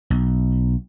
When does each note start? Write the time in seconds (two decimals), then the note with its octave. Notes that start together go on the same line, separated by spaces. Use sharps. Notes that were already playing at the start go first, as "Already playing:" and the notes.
0.10 B1